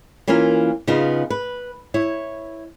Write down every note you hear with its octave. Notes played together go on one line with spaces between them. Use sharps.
E3 A#3 C#4 F4 A#4
C#3 B3 D#4 F4
B4
E4 C#5